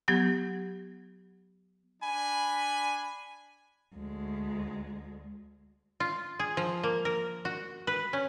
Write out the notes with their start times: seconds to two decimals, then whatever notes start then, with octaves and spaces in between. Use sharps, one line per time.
0.08 F#3 B3 G4 F#5 G#6
2.02 D4 G#5 B5
3.95 D2 G#3
6.00 F4
6.39 G#4
6.57 F3
6.83 A#3
7.05 A#4
7.45 F#4
7.87 B4
8.13 C#4